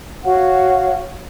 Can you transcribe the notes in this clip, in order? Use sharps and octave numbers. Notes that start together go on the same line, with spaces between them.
F#4 C#5 F5 F#5